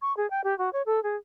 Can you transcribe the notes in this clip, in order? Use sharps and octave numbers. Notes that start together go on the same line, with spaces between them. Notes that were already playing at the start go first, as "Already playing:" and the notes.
C#6
G#4
G5
G4
F#4
C#5
A4
G#4